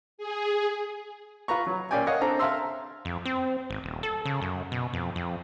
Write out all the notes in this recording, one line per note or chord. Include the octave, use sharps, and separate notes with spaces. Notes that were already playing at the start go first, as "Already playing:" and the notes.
G#4
F4 B4 A#5 C#6
F#3
A#2 C#4 D5 G5 G#5
A#4 C#5 D#5 F5 F#5
C4 D4 A4 A#5
E5 F5 A5 A#5 C6 E6
F2
C4
G#1
D#1
A4
C#3
F#2
B2
F2
F2